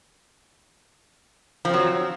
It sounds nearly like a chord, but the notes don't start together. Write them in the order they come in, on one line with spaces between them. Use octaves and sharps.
F3 C4 F#3